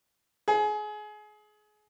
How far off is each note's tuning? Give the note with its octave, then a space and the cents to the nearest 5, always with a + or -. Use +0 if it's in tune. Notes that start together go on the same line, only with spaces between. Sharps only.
G#4 +25